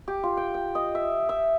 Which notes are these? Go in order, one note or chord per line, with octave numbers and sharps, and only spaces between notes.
G4
F4
G5
G5
D#5
E5
E5